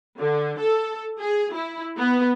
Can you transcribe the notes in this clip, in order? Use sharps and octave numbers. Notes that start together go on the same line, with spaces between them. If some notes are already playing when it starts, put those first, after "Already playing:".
D3
A4
G#4
E4
B3